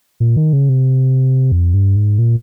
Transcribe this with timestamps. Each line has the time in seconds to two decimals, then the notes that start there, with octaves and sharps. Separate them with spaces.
0.20 A#2
0.36 D#3
0.53 C#3
0.69 C3
1.52 F2
1.74 G2
1.96 G#2
2.19 A#2